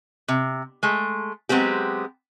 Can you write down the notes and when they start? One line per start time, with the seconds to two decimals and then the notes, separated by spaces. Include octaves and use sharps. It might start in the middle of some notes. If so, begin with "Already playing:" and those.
0.28 C3
0.83 G#3 A3
1.49 F#3 G#3 B3 C4 G4